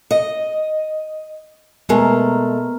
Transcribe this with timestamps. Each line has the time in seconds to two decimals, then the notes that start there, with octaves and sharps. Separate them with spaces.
0.11 D#5
1.89 B2 G#3 A3 B3 A#4